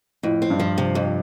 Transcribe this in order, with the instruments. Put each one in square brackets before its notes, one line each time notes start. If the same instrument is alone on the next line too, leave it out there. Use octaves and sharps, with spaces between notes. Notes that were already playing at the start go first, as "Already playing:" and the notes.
[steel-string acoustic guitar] F2 [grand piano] A2
[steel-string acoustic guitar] C4
[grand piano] G2
[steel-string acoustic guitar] F3
C3
F2